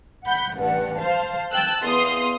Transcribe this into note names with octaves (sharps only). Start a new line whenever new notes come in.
F#5 B5 G6
A1 G2 F#5
C5 F5 A5
G5 A5 E6 F#6
E2 F5 C6 D#6